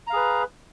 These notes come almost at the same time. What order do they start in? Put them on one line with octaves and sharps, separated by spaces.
A#5 F5 G#4 B4